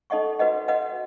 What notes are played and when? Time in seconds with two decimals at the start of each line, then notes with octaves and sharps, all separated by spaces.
0.10 D#4 A4 D#5 F#5 C#6
0.39 F#4 B4 D#5 F#5
0.68 F#4 B4 D#5 F#5